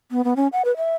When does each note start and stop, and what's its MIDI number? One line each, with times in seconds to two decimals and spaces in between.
0.11 0.24 59
0.24 0.34 59
0.36 0.48 61
0.53 0.62 78
0.65 0.75 71
0.77 0.96 76